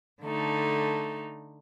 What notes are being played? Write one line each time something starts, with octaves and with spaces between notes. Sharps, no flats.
D3 A3 D#4